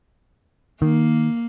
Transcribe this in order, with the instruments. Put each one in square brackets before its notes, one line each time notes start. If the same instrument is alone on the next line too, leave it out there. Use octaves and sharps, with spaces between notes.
[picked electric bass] D#3 [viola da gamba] A#3